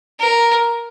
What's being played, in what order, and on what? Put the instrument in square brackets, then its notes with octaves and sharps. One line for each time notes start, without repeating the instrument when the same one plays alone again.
[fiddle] A#4